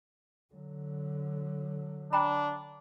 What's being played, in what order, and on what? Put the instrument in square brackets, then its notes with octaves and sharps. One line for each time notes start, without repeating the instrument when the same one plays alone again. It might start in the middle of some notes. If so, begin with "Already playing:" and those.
[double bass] D3 F#3
[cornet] D4 [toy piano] G5 A#5 B5